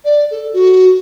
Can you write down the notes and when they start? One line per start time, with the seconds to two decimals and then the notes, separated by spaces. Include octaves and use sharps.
0.05 D5
0.31 A4
0.53 F#4